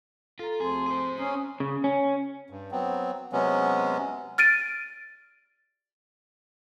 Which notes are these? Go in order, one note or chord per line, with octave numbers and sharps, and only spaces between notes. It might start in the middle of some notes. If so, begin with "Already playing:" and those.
F4 A4 A#5
D2 F3 C4 G#4 C6
G#4 C5
C#4 A#5 C6 D#6
C#3
C#4
G2
F#3 B3 C4
C3 F#3 G#3 B3 C#4
F6 A6 D7 D#7